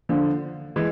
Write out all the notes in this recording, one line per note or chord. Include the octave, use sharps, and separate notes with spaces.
D3 F3
E3 G#3